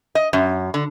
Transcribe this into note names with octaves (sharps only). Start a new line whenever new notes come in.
D#5
F#2
D3